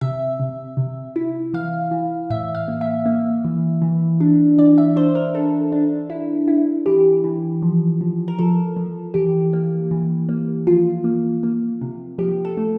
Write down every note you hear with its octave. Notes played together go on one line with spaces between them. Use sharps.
C3 E5
C3
C3
E4
E3 F5
E3
A2 E5
F5
A#3
E5
A#3
E3
E3
D4
E3 D5
E5
D4 C5
A#4
D4 A4
D4
E4
E4
E3 G4
E3
F3
F3
A#4
F3 A4
F3
E3 G4
A#3
E3
A#3
F3 F4
A#3
A#3
C3
F3 G4
A4
A3